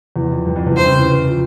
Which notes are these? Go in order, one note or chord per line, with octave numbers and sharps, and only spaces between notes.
E2
F2
G2
F2
E2
C3 C5
C#3
E3
C#3
E3
F3